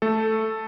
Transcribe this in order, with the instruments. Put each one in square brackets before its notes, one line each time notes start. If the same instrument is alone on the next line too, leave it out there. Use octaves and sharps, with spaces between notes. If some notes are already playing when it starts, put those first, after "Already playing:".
[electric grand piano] A3 A4